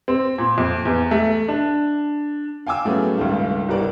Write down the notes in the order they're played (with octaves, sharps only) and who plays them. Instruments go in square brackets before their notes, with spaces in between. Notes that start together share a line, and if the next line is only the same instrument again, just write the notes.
[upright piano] C4
A#2
F2
E2
A3
D4
F5 G5 G#5 D6 E6
A2 F#3 A3 B3 C#4 G#4
C#2 G2 D#3 A3 F4
G1 C2 E3 G4 A#4 D5